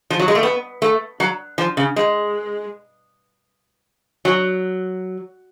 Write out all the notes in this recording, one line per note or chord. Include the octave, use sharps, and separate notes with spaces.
F3
F#3
G#3
A3
B3
A3
F#3
F3
C#3
G#3
F#3